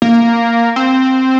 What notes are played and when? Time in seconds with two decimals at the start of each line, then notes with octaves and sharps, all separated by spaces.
0.02 A#3
0.76 C4